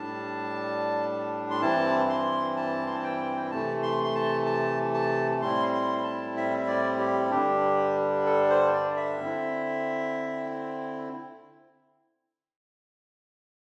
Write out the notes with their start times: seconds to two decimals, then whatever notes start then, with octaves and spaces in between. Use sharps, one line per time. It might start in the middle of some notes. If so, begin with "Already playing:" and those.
Already playing: A2 G3 D4 A5
1.50 C6
1.61 G2 E3 C4 E4 A5
2.09 C6
2.57 A5
2.87 C6
2.95 A5
3.04 G5
3.51 C3 E3 A3 A5
3.83 C6
4.04 C6
4.15 A5
4.46 A5
4.94 A5
5.41 A2 G3 C4 E4 C6
5.72 C6
6.04 A5
6.37 E5
6.58 E5
6.67 D5
6.99 G4
7.30 G2 D3 G3 D4 G4
8.26 A4
8.50 C5
8.74 D5
8.96 E5
9.20 D3 C4 E4